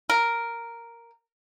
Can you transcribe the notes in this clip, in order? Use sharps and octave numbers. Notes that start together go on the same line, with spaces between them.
A#4